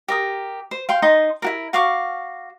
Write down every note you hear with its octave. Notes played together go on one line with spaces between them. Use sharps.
G4 A#4 D#6
C5
F5 G5 C6
D#4 C6 D#6
E4 F#4 A#4
F#4 F5 C#6 D6